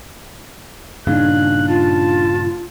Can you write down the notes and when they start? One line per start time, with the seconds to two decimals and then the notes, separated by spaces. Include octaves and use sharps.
1.07 G2 A#2 C#3 D4 D#4 F5 F#6
1.68 F4 A5